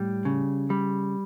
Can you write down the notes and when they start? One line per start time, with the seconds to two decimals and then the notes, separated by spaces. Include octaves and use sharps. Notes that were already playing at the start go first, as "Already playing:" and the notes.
Already playing: A2 G3
0.25 C#3
0.70 G3